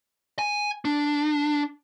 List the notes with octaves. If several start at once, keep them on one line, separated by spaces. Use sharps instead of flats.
G#5
D4